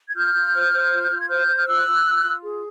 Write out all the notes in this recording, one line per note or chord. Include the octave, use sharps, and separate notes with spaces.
G#6
F4 F6 G6
F4
C5
C5
F4
F4
G#6
C5 F6 G6
C5
F6
F4 E6 F#6
F4
F4
F4
G#4